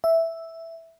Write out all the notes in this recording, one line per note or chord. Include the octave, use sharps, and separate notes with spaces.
E5